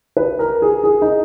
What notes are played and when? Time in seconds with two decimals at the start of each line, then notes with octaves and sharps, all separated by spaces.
0.17 B4
0.39 A#4
0.62 G#4
0.84 G#4
1.02 D#4